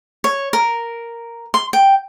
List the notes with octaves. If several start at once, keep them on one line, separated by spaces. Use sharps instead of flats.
C#5
A#4
C6
G5